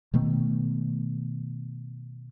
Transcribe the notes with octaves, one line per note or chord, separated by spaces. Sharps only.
B2 D#3 A3 B3